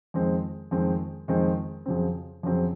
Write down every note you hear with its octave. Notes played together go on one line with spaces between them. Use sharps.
F2 D#3 G#3 C4
F2 D#3 G#3 C4
F2 D#3 G#3 C4
F2 C#3 F#3 C4
F2 C#3 F#3 C4